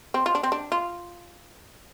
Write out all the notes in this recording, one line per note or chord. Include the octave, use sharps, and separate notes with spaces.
C4
F4
D4
C4
D4
F4